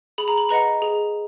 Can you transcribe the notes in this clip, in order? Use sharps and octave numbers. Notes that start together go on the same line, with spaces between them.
G#4 B5
A#5
B5
B4 D#5 F#5 A#5
G#4